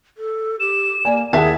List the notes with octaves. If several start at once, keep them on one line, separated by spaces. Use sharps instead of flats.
A4
G4 E7
A#3 D5 G#5
D#2 E4 G#4 E5 F#5 A5